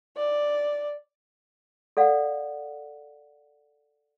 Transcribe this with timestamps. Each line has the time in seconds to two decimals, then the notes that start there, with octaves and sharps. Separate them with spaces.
0.17 D5
1.97 A4 D5 F5 F#5